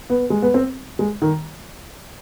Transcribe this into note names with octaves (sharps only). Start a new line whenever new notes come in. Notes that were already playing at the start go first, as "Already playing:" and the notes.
B3
G#3
B3
C4
G#3
D#3